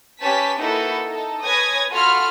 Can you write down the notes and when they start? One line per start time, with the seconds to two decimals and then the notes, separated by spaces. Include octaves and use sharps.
0.22 C#4 G4 B4 A5 B6
0.61 A#3 D#4 E4 F#4 A4 B4
1.08 D#4 A4
1.44 B4 C#5 G#5 D#6 G#6 A#6
1.90 F4 F#4 A4 B5 F6